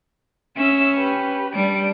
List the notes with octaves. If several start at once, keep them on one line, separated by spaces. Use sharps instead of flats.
C#4 E5 E6
G4 B4
G3 D4 D7